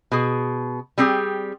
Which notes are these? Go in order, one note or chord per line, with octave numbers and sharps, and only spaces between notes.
B2 G#4
G3 C4 G4 G#4